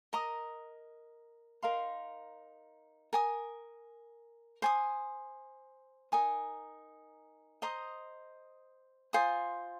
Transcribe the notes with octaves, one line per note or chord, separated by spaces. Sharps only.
A#4 D#5 A#5 D#6
D#4 A#4 F5 C6
A#4 G#5 D#6
C5 G#5 D#6
D#4 A#4 G#5 D#6
C5 D#5 A#5 D#6
F4 C5 G#5 D#6